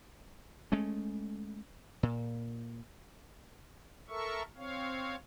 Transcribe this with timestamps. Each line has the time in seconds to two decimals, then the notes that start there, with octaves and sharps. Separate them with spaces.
0.72 G#3 A3 C#4
2.03 A#2
4.09 A4 A#4 E5 C#6
4.56 C4 C#5 F5